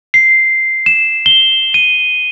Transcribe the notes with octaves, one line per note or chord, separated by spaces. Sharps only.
C7
E7
G7
D#7